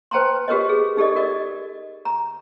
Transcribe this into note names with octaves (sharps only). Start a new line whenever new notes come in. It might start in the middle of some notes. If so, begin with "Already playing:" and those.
B4 C5 G5 A5 A#5 C6
F#4 G4 A#4 B4 C#5 D#5
G#4
D#4 G4 A4 D5 D#5
F#4 A#4 D5 D#5
A#5